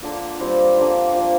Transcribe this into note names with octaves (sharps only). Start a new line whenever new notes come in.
D3 A#3 F4
G3 C4 F4 A#4
D3 A#3 F4
A#2 F3 A#3 F4